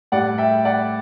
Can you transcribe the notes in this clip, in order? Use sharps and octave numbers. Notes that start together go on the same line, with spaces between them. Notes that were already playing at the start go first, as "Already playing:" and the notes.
A2 G3 D5 F#5
E5 G5
D5 F#5